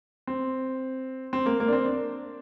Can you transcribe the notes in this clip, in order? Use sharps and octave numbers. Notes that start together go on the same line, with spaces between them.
C4
C4
A#3
A#3
D4
C4
D4